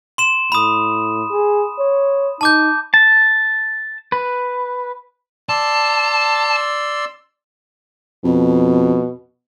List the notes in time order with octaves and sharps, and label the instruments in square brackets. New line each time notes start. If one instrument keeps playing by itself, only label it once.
[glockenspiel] C6 E7
[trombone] A2 [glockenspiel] B5 D#6
[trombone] G#4
C#5
[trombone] D#4 [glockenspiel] A5 D6 G6
[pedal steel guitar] A5
B4
[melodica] D5 C6 E6 [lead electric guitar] A5
[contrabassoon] F2 [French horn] B2